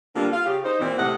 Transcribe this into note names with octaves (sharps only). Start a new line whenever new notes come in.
D3 G3 A#3 C4 F4
F4 F5
C#3 G4
D#4 C5
D#2 A#2 E3 C4
A2 C3 D#5 F#5